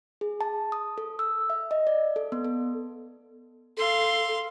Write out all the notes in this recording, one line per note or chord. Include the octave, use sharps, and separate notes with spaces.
G#4
A5
D#6
A4
E6
E5
D#5
D5
A4
B3
A4
A4 F5 C6